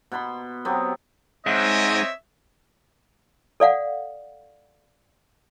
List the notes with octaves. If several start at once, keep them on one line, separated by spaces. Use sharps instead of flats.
B2 F#5 B5 C6
F#3 B3 C4 G4
G#2 C4 C#5 D#5 E5
A4 D5 F5 F#5